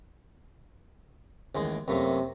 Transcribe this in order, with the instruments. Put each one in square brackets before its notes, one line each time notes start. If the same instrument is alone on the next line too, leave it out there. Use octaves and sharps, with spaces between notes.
[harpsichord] A1 D#2 G#3
[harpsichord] F#2 A3 A#3 [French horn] C3